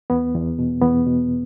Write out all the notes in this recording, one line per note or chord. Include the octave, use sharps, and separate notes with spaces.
E2 B3
E2
B2
E2 B3
B2